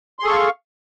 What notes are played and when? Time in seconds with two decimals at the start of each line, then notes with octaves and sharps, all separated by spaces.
0.19 C6
0.22 G#4
0.25 A4
0.28 C#6
0.31 F5